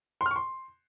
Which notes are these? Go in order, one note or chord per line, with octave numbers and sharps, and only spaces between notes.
C6
F6
C#6
C6